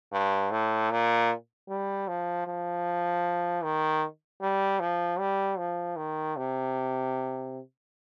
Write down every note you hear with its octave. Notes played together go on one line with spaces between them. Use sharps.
G2
A2
A#2
G3
F3
F3
D#3
G3
F3
G3
F3
D#3
C3